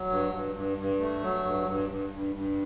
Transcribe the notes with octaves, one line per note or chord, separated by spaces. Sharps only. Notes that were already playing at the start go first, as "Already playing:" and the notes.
Already playing: F#3
G2
G2
G2
G2
A3
F#3
G2
G2
G2
G2
G2